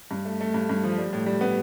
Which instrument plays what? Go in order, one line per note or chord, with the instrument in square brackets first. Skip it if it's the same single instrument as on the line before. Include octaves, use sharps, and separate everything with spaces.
[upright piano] G2
A3
A3
G2
G2
F3
G3
A2
G3
B3